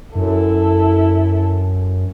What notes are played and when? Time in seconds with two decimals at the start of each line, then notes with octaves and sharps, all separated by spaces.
0.16 F#2 E4 A4